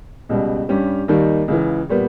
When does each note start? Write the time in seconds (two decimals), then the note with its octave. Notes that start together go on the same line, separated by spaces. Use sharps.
0.29 C#2 B2 G3
0.69 G2 G3 C#4 G4
1.08 D#2 D#3 G3 A#3 D#4
1.48 C#2 C#3 E3
1.89 A#2 G3 B3